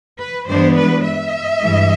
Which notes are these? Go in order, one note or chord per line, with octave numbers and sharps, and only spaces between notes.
B4
G2 E3 G#3 B3 D4 C5
B4
E5
G2 E3 G#3